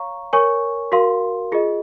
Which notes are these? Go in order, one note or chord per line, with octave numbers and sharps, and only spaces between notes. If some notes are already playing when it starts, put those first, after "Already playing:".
Already playing: C#5 F5 A#5 C#6
A#4 C#5 G#5 C#6
F#4 A#4 F5 C6
F4 G#4 D#5